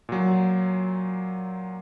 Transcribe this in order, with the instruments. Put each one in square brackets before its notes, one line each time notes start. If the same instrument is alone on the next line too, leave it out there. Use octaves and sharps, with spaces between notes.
[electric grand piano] A#2 F#3